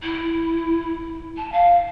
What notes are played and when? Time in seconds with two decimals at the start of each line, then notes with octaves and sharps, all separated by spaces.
0.02 E4
1.37 A5
1.52 F5